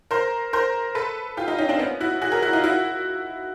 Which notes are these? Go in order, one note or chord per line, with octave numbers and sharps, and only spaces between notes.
A#4 C5
A#4 C5
A4 B4
F4 G4
D#4 F4
C#4 D#4
C4 D4
B3 C#4
E4 F#4
F#4 G#4
G#4 A#4
E4 F#4
D#4 F4
E4 F#4